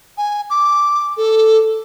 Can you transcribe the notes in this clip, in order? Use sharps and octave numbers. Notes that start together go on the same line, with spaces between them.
G#5
D6
A4